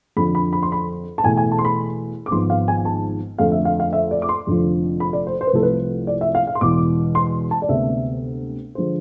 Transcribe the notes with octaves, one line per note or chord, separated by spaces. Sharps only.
F2 D3 F3 B5
B5
B5
C6
B5
A5
E2 B2 A3 G#5
G#5
A5
C6
B5
D6
G#1 G#2 F3 B3 C6
F5
G#5
A5
F2 D3 F3 A3 F5
E5
F5
F5
E5
D5
D6
C6
F1 F2 D3 F3
B5
D5
C5
C5
B4
C2 C3 F3 A3 A4
B4
D5
E5
F5
F5
C6
E1 E2 B2 D6
C6
A5
D5
D2 C3 G#3 B3 E5
D3 F3 G#3 C5